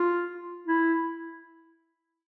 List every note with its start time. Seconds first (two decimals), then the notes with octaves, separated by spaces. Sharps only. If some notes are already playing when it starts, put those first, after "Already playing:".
Already playing: F4
0.67 E4